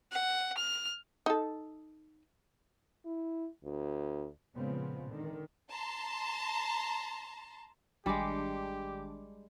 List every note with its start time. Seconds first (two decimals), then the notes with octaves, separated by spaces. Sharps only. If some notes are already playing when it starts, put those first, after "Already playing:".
0.12 F#5
0.57 F6
1.26 D#4 A4
3.05 E4
3.64 D2
4.56 A#2 C#3 F3 G#3 B3 C4
5.11 D3 D#3
5.71 A5 A#5 C6
8.06 G#1 G3 G#3 D4 G4 D6